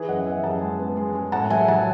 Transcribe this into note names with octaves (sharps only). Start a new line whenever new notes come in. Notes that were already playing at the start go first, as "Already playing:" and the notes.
Already playing: E3 G#4 B4
F#2 D#5 F#5
B3 E5 G#5
F#2 F#5 A5
G#3
B3
G#3
G#3
A2 F#5 A5
F#3 E5 G#5
F#3 F#5 A5